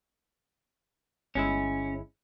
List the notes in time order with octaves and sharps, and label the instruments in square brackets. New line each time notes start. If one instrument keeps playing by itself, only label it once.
[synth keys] G1 G#3 E4 [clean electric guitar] C#4